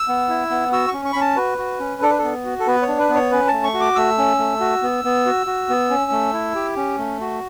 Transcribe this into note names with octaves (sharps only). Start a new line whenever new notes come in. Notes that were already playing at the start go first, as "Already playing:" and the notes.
Already playing: E6
B3
E4
B3
F#4 E6
C#6
C#4
C#6
C#4 B5
A5
F#4 B4
F#4
C#4
D4 A4
B4
B3 A4
F#4
A4
B3 B4
C#5
D4
B4
B3
C#5
C#4 B4
A3 A5
C#6
F#4
D6
A3 E6
C#4
A3
F#4
B3
B3
F#4
F#4
B3
C#4
A3
E4
G4
C#4
A3
F#4